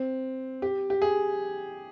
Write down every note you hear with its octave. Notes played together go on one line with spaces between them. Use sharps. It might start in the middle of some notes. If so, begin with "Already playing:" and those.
Already playing: C4
G4
G4
G#4